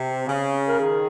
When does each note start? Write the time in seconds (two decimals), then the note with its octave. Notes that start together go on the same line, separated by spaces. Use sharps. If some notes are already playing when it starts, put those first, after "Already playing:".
Already playing: C3
0.27 C#3
0.67 A#4
0.79 D#3 G#4